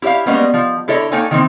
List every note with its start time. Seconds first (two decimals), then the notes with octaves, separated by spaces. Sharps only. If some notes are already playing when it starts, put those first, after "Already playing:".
0.02 E4 G4 C#5 E5 F5
0.26 G3 G#3 A#3 B3 C#4 D#5
0.54 F3
0.88 D3 E4 A4 C#5 D#5 E5
1.12 A#3 D#4 A4 C#5 G5 G#5
1.31 D#3 E3 A#3 C4 D#4